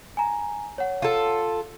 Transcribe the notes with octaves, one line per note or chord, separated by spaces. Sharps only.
G#5 A#5
C#5 F#5
F4 A4